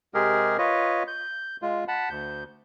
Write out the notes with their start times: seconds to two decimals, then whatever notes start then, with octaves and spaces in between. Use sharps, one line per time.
0.14 C3 G#3 G4 G#4 A#4
0.58 F4 B4 C#5 D#5
1.08 G6
1.62 G#3 F4
1.88 F#5 A5 B5
2.10 D2 G6